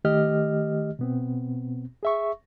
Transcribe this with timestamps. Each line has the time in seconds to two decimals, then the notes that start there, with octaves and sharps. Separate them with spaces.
0.04 D#3 A3 G4 D#5 F6
0.99 B2 B3 C4
2.03 G#4 E5 C#6